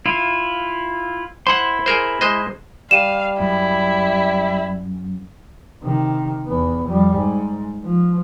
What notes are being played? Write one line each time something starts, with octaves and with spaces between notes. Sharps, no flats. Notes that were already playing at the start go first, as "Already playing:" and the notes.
E4 F4
E4 C5 F#5 C6
G#4 A#4 C5
G#3 C5 D#5
G3 F5 D#7 E7
F#2 E4
C3 D#3
E2 B3
F2 G3
G#2
F3